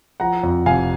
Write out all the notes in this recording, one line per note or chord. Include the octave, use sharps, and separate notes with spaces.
F3 F#5 A#5
F2
F1 F5 G#5